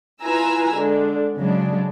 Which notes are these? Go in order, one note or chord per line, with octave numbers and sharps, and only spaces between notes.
E4 F4 B4 G#5 A#5 E6
D3 G#3 D4
C#3 F#3 G#3 D4